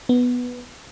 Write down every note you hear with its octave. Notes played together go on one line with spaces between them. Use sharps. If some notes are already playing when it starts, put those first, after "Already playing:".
B3